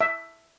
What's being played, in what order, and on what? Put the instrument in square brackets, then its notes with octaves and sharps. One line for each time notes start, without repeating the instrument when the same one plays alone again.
[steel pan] E5